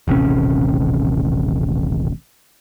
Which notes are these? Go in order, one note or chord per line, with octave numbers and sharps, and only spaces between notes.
D#1 A1 C3 C#4